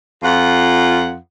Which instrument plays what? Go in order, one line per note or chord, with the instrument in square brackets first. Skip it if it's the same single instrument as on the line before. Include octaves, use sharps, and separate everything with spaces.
[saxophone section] F2 F4 F#5